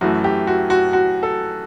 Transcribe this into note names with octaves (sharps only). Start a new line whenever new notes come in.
F#2 E3 A3 F#4
G4
F#4
F#4
F#4
A4